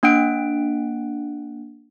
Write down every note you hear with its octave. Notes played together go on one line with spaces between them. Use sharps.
A#3 D4 F#5 F#6 D7